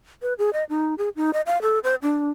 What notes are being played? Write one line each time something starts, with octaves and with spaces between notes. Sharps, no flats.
B4
G#4
D#5
D#4
G#4
D#4
D#5
F5
A4
C5
D4